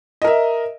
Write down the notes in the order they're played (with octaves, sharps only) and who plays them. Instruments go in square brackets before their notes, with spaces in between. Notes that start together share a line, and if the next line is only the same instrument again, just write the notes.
[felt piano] D#5
A#4
E5